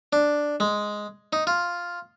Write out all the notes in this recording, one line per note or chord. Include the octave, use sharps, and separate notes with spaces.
D4
G#3
D#4
F4